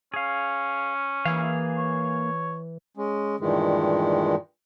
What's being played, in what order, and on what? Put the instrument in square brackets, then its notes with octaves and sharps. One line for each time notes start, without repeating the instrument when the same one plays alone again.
[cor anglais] C#4 [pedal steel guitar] G#4 F5
[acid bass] E3 [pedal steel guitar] A#3 G#4 F5
[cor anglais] C#5
[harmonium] G#3 C#4
G2 A#2 D#3 E3 G#3